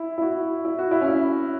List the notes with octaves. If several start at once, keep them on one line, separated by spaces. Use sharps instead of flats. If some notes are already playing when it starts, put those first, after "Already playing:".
Already playing: E4
E4
F#4
E4
F#4
E4
C#4
E4